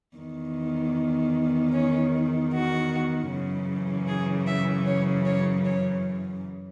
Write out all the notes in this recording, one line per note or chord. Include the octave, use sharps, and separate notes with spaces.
E2 D#3
C#4
F#4
F#2 C#3 E3
G#4
E5
C#5
C#5
C#5